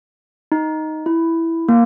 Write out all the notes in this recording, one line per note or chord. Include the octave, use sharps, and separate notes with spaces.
D#4
E4
A#3